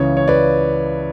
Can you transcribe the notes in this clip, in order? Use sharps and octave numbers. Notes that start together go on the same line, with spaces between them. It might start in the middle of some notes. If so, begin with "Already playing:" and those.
Already playing: C#2 C#3 E3 C#5
C#5
B4 D5